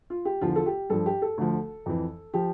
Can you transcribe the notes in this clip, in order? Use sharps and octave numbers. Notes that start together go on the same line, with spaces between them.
F4
G4
E2 D3 F3 F4
A4
G4
G2 F3 A4
G4
A4
D2 D3 F3
F2 E3
F3 G4